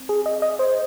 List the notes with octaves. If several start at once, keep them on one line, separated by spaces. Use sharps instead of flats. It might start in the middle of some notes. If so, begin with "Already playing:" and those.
Already playing: C4
G#4
D#5
D#5
C5